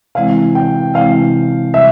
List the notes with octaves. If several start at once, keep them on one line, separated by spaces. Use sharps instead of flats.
C3 E3 G#3 C4 E4 F5
G5
C3 E3 G#3 C4 E4 F5
C3 G3 E5